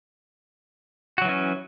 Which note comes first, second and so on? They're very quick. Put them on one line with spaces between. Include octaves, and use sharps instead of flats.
F#4 F#3 E3 C#4